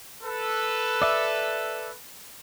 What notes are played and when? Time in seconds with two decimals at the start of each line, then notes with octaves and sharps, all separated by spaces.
0.23 A4 B4
1.02 D5 E5